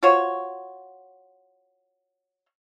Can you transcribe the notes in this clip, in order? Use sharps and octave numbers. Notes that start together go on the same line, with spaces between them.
F4 F#4 C5 C#5